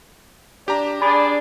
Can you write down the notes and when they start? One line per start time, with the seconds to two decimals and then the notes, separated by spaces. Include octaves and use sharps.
0.68 D4 G4 A#5
1.02 D4 G#4 D5 B5